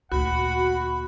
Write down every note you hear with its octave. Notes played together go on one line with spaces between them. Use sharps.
D2 A#2 F#4 F#5 B5